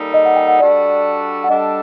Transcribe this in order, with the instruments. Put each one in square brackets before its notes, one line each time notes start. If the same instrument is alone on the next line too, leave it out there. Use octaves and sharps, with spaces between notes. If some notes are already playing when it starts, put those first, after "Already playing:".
Already playing: [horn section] G3 A#3 D#4 A4
[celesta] D#5
F#5
G5
F#5
[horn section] G3 D4 F#4 A4 [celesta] D5
[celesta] F#5
[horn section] G3 D4 A4 [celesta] D#5